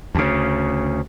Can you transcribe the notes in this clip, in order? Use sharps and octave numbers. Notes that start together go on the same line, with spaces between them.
D2 C#3